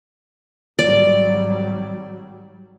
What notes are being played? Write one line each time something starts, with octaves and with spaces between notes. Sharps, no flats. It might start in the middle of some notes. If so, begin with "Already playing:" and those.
G#1 F#3 G3 D5